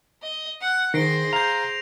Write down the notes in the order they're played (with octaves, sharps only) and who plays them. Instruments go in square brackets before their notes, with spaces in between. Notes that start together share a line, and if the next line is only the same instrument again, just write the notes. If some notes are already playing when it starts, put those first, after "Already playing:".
[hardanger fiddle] D#5
F#5
[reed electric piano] D#3 [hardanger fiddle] G#4 C5 [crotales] A#6 C7 D7
[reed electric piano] F5 A#5 [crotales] G6 F7